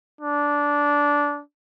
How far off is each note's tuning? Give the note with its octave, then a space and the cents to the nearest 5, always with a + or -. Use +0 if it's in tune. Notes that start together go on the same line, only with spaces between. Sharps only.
D4 -15